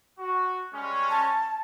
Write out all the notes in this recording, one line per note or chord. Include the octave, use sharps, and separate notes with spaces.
F#4
G3 G#3 C#4
A5